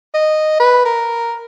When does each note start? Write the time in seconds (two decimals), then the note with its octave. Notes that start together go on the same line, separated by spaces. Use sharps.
0.14 D#5
0.60 B4
0.85 A#4